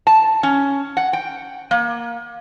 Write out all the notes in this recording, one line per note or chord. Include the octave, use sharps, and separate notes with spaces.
A5
C#4
F#5
G5
A#3